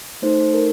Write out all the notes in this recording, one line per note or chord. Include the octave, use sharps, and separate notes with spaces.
A3 D#4 A4 C5
A#4